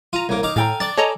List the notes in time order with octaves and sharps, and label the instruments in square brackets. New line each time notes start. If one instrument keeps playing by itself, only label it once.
[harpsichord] F4 [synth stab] A#5 D#7
[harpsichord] C2 A#3 [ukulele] A#4 C#5
[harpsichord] D#4 F5 D6
[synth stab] A2 [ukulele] A4 G5 A#5 [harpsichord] F5 G#5
[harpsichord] D4 D5 [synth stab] A6
[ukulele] A4 G#5 [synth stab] C#5 D#5 A#5